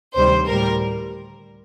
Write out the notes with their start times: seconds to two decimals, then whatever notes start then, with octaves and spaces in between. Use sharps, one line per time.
0.16 D2 C3 D#3 G3 C5
0.49 A2 G3 A#4